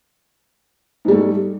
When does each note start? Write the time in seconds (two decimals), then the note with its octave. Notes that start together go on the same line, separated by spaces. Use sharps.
1.05 G#2
1.08 G3
1.11 A3